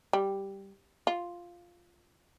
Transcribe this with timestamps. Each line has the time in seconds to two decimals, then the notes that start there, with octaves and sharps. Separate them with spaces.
0.13 G3
1.07 F4